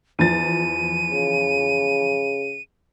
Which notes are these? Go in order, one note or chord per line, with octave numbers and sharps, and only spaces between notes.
E2 F3 A6 D#7
C#3